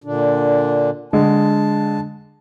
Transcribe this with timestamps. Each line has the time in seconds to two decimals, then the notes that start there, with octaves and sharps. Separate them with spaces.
0.04 A#2 D3 D4
1.13 D3 G#3 A5